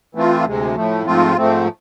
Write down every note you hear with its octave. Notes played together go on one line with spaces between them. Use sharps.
E3 A3 C4 F4
D2 C3 G#3
A2 F3 A3
G#2 F3 A3 C4 F4
G#2 F3 A3 C4